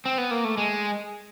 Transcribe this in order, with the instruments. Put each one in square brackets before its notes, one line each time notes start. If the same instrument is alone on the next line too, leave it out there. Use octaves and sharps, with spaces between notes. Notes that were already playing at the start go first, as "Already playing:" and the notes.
[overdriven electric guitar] C4
B3
A#3
A3
G#3